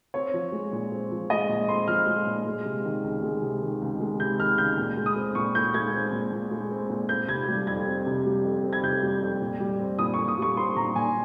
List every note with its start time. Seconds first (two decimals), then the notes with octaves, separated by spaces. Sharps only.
0.14 C4 C#5
0.34 F3
0.52 G#3
0.73 A#2
0.92 C4
1.11 F3
1.30 G#3 D#5
1.49 A#2
1.68 C4 C6
1.88 F3 F6
2.07 G#3
2.27 A#2
2.46 G#3
2.65 C3
2.85 D#3
3.04 C#2
3.23 G#3
3.42 C3
3.61 D#3
3.82 C#2
4.00 G#3
4.20 C3 G6
4.39 D#3 F6
4.58 C#2 G6
4.77 A#2
4.97 G#3
5.06 D#6
5.16 C4
5.35 A#2 C#6
5.55 A#2 G6
5.74 G#3 G#6
5.94 C4
6.12 A#2
6.32 A#2
6.51 G#3
6.71 C4
6.90 A#2
7.09 C4 G6
7.28 C3 G#6
7.48 G3
7.67 F2 G#6
7.87 C4
8.06 C3
8.26 G3
8.44 F2
8.64 C4
8.73 G#6
8.83 C3 G6
9.02 G3
9.22 F2
9.41 A#2
9.60 G3
9.80 C4
9.99 A#2 D#6
10.14 C#6
10.18 A#2
10.28 D#6
10.38 G3 C#6
10.57 C4 C6
10.76 A#2 A#5
10.96 A#2 G#5